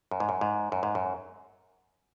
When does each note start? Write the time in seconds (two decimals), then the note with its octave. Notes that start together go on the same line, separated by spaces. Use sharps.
0.11 F#2
0.20 G#2
0.29 F#2
0.41 G#2
0.72 F#2
0.83 G#2
0.95 F#2